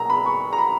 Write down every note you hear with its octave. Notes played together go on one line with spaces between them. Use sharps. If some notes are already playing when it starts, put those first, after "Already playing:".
Already playing: B1 B2 A#3 A#5
B5
C#6
A#5
B5